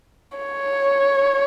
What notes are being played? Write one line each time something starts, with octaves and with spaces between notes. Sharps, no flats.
C#5